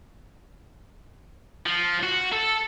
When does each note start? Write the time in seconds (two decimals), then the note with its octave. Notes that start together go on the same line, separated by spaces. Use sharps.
1.66 F3
2.03 F#4
2.32 A4